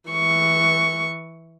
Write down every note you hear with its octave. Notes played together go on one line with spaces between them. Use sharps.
E3 C#6